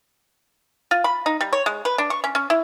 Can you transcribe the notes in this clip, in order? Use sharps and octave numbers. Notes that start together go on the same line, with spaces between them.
F4
B5
D#4
G3
C#5
G#3
B4
D4
C#6
C#4
C#4
E4